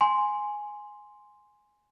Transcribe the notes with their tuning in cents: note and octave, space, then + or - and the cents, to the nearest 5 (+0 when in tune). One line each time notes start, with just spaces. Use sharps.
G#5 +0 C6 +0